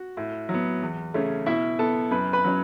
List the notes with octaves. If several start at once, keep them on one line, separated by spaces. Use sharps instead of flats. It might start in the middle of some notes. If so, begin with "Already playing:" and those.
Already playing: F#4
A2
F#3 B3
E2
C#3 A3 C#4
B2 E4 E5
B3 A4 A5
F#2 B4 B5
B4 B5
F#3 C#4